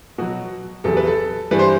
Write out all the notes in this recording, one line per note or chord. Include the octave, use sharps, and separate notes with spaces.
B2 F#3 F#4
E2 C3 F#3 A4
B4
A4
G2 E3 G3 B4
C5